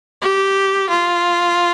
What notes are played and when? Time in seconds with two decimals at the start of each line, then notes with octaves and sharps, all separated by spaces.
0.21 G4
0.89 F4